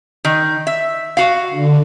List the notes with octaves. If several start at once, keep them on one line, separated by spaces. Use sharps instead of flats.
D#3
E5
F#4 F5
D3